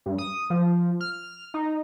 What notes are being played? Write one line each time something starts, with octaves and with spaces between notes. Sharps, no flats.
G2
D#6
F3
F6
D#4